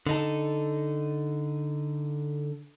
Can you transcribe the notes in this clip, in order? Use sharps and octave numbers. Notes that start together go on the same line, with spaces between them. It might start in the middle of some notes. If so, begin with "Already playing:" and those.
D3 D#4 A4